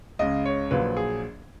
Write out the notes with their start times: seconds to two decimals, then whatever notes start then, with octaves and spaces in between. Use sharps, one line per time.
0.19 C#2 C#3 G#3 D#5
0.45 C#5
0.71 A#1 A#2 F#3 B4
0.97 G#4